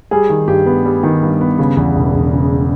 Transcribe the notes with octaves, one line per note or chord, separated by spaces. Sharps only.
G3 G#4
D#3
G2 G4
B3
G3
D#3
G2
B3
C#3
E2
E1
E1
C#3